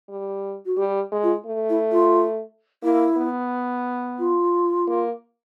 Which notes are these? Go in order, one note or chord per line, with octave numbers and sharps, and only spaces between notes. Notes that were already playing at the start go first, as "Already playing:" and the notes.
G3
F#4
G3 G4
G#3
F4
A3
E4
F4
A#3 E4
B3
F4
A#3